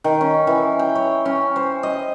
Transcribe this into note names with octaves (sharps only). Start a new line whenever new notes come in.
D#3
C#4
E3
G5
C#5
C#4
C5
D#5